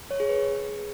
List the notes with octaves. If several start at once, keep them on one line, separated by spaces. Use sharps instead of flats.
C#5
G#4
B4